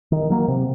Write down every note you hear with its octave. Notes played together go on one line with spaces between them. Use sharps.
D#3
F#3 A#3
C3